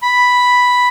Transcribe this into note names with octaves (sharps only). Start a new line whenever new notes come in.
B5